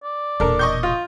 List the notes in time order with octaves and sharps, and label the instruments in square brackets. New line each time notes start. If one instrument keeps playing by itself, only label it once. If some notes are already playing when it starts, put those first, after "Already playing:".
[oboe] D5
[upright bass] E1 A#2 [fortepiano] D4 A#4 [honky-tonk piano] A4
[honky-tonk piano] D#5 C#6 G6
[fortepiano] F4